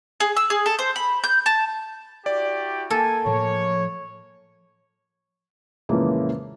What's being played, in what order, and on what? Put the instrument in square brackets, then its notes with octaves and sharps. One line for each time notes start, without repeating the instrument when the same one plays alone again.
[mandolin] G#4
E6
G#4
A4
C5
B5
G6
A5
[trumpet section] E4 F#4 G4 [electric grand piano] D5
[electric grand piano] A#3 [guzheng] A4 [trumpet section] G#5
[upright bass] A2 F3 [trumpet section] C#5
[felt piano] F2 A#2 C#3 E3 G#3 A#3